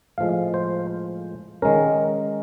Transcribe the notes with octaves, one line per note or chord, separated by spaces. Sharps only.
A2 F3 G#3 F5
C5
D#3 G#3 C#4 A#4